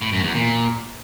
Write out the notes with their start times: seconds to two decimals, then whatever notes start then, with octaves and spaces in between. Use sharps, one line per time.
0.01 A2
0.12 F#2
0.24 E2
0.35 A#2